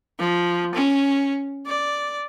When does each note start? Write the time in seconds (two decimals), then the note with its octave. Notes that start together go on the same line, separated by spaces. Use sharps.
0.19 F3
0.75 C#4
1.66 D5